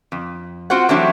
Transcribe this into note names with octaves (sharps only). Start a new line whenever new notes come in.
F2
C4 F4 F#4 C5 F#5
E3 F#3 G3 A3 C4 D4